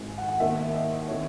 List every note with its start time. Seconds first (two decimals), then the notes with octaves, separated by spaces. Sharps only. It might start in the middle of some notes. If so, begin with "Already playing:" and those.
Already playing: G#1 G#2 D#3 G#5
0.18 F#5
0.28 F#5
0.40 D#2 D#3 E5
0.74 D#5
1.08 C3 D#3 C#5